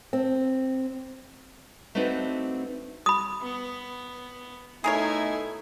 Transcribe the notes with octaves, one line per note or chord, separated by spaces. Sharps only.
C4
A3 C4 D4 D#4 F#4 B4
B5 D#6
B3
B2 A3 D#4 E4 G#4 A#4 C#5 G#5